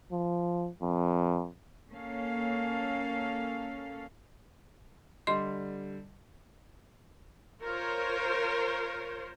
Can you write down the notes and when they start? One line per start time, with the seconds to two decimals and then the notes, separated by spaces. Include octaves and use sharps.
0.11 F3
0.82 F2
1.90 A#3 C#4 A4 F5
5.27 D3 G3 D#5 C6
7.62 F4 A#4 C5 C#5